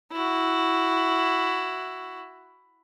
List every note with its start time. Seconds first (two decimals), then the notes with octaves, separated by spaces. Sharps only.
0.12 E4 F#4